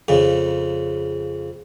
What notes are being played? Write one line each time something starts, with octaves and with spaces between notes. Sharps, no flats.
F2 C#3